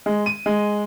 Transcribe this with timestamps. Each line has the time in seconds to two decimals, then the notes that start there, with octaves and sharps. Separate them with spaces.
0.06 G#3
0.26 D#7
0.46 G#3